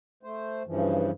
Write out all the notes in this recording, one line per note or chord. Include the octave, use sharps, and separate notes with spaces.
A3 C5
G2 C#3 E3 F3